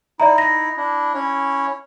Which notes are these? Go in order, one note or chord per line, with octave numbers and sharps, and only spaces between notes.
D#4 E4 D5 E5 A#5
A#6
D4 E4
C#4 E4 C#5